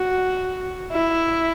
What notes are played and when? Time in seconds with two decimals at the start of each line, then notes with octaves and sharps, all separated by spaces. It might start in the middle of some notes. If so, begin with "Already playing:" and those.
Already playing: F#4
0.91 E4